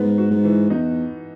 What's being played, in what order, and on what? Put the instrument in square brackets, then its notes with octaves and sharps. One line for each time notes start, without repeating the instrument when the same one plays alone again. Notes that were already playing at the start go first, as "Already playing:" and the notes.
Already playing: [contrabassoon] G#2 [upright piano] B3
[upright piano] F#4
[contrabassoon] G#2
[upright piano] E3
[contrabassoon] E2 [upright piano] D#4